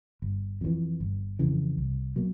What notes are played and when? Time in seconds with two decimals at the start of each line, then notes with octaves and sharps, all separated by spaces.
0.22 G1
0.61 F2 C#3 E3
1.00 G1
1.39 F2 C#3 E3
1.78 C2
2.16 B2 F#3 A#3